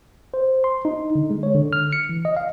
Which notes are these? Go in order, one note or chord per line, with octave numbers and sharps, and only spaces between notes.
C5
C6
D#4
D3
G#3
C#5
D3
F6
C#7
E3
D#5
F5